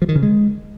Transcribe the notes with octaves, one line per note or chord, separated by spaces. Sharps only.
F3
D#3
C#3
G#3